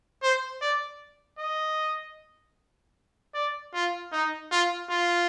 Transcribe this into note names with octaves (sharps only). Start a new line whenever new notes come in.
C5
D5
D#5
D5
F4
D#4
F4
F4